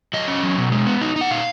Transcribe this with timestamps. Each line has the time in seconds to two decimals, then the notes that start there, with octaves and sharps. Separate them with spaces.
0.13 F#3 D#5
0.28 C#4
0.43 F#3
0.58 B2
0.72 G#3
0.87 B3
1.02 D#4
1.16 D#4
1.21 F#5
1.30 A#2 F5